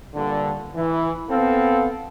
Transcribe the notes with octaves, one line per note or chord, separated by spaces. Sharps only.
G2 A#2 D3
E3
B3 C4 A4 F5